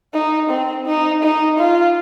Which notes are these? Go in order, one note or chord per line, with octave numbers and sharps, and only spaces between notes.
D#4
C4
D#4
D#4
F4